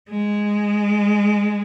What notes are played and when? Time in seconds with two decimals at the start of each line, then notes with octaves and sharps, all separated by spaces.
0.11 G#3